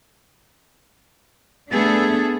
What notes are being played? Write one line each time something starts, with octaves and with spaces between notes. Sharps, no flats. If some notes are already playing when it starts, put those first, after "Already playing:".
A3 B3 D4 G#4 A4